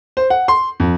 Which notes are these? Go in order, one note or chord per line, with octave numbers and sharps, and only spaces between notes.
C5
F#5
C6
F2